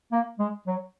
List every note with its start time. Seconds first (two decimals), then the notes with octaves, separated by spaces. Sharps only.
0.12 A#3
0.39 G#3
0.67 F#3